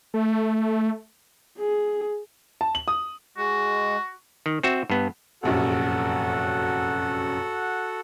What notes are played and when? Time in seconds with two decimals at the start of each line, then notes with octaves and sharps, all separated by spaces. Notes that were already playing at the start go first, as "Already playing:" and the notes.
0.14 A3
1.59 G#4
2.61 A5
2.75 F#7
2.88 D#6
3.37 G#3 F#4
4.46 D#3
4.63 C4 F#4 E5
4.90 G2 B3
5.43 F1 A#1 F#2 F#4 A4 F#5